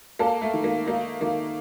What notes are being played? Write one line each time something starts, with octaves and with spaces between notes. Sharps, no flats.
A#3 A4
A3
D#3
A#3
A#3 D#4
D#3 A#3